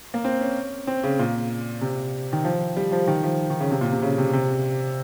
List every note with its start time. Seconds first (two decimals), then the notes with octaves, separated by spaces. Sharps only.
0.14 A#3
0.25 C4
0.41 C#4
0.87 C4
1.04 C#3
1.19 A#2
1.81 C3
2.33 D#3
2.45 F3
2.77 G3
2.92 F3
3.08 D#3
3.24 F3
3.50 D#3
3.60 C#3
3.71 C3
3.81 A#2
3.92 C3
4.02 C#3
4.18 C3
4.33 C3